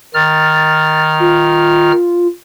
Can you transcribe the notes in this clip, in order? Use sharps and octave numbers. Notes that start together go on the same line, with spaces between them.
D#3 F6 A6
F4